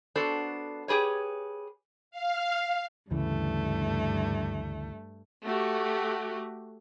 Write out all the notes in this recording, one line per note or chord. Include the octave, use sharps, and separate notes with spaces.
B3 D4 F#4 A4 C5
G4 G#4 B4 C#5
F5
D2 G2 C#3 E3 A3
A3 F#4 G4